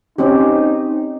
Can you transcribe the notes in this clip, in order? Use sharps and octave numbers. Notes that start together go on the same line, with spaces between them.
C4 C#4 D#4 G4